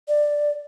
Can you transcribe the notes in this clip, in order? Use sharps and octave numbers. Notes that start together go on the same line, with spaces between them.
D5